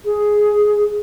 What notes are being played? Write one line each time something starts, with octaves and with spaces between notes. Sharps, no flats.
G#4